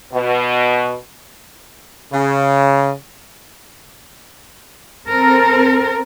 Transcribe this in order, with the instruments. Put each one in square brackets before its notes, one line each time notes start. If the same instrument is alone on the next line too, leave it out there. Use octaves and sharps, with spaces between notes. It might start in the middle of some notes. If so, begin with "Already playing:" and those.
[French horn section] B2
[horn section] C#3
[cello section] C4 A4 A#4